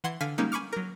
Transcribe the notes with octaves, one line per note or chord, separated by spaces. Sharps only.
E3 F#5 C6 G#6
D3 F5 G#5 F6 B6
G3 G#3 A#3 C#4 D#4
G#5 B5 C#6 D6 F6
F#3 A#4